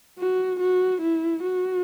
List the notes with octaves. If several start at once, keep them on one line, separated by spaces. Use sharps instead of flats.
F#4
F#4
E4
F#4